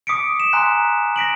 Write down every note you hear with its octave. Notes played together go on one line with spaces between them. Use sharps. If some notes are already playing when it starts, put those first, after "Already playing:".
D6 D#6 B6 C#7 D7
E7
G#5 A#5 C6 F#6 B6
A#6 B6 D7 F#7